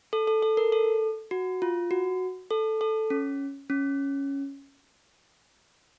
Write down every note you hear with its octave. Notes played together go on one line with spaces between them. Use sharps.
A4
A4
A4
A#4
A4
F#4
F4
F#4
A4
A4
C#4
C#4